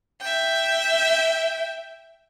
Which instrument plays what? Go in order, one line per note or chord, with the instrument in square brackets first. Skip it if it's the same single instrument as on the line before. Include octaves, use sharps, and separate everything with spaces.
[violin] E5 G5